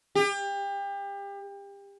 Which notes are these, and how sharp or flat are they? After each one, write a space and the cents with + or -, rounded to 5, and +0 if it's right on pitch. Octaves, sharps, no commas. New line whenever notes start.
G4 +30